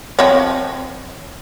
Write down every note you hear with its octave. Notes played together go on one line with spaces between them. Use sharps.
F3 C4 C#5